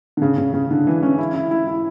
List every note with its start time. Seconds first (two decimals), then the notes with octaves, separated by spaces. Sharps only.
0.17 D3
0.22 C#3
0.38 C#3
0.54 C#3
0.71 D3
0.87 E3
1.03 C#4
1.18 E4
1.35 E4
1.51 E4
1.67 E4